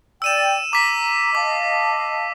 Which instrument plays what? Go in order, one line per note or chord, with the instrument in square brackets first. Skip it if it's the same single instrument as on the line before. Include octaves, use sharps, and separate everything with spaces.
[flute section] D5 G5 [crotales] E6 D#7 E7
[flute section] A#5 [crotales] D6 B6
[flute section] D#5 F5 A5 [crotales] D6